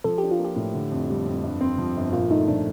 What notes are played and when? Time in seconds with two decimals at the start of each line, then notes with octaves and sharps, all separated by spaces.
0.04 F3 A4
0.18 D4 G4
0.31 F4
0.39 A#3
0.44 G4
0.56 A2
0.74 D3
0.92 F2
1.09 G3
1.26 F2
1.44 G2
1.61 C4
1.78 F3
1.96 G1
2.13 A#2 F4
2.31 A3 D#4
2.48 F3 D4